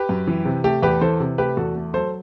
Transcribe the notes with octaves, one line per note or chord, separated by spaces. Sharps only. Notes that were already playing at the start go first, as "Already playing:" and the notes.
Already playing: G4 B4
F#2
E3
C3
A3 G4
E2 G4 B4
E3 A4 C5
C3
A3 G4 B4
E2 F#4 A4
A3
F#3 A4 C5